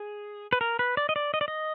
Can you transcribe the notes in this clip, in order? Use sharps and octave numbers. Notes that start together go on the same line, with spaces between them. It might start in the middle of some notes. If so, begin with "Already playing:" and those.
Already playing: G#4
B4
A#4
B4
D5
D#5
D5
D#5
D5
D#5